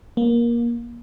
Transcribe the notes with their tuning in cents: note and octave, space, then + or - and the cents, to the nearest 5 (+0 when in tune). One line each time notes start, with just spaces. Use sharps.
A#3 +20